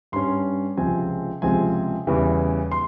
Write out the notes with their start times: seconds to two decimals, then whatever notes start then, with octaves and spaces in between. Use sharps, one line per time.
0.12 G2 G3 C#4 C6
0.77 C#2 C3 F3 G#3 C4 G#5
1.42 C#2 C3 F3 G#3 C4 G#5
2.07 E2 C#3 E3 G3
2.72 C6